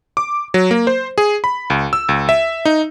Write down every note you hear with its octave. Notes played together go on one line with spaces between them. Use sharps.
D6
F#3
A#3
C5
G#4
B5
C#2
E6
C#2
E5
D#4